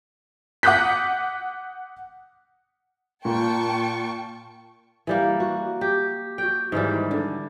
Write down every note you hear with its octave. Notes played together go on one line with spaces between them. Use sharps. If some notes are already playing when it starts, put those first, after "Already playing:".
F#5 D6 D#6 F#6 G6 B6
A#2 A#3 G5 A5 C#6
E3 G3 A#3
F#4
G4
F#4 G5
G#2 D#3 E3 G3
D3